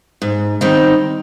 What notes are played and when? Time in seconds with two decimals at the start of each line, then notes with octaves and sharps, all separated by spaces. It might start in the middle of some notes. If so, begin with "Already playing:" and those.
0.22 G#2
0.61 D#3 G3 C4 D#4